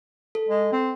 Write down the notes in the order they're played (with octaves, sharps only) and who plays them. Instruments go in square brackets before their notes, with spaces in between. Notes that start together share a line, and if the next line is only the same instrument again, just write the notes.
[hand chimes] A4
[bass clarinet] G#3
C4